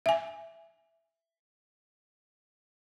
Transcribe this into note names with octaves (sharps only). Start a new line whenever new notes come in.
E5 G#5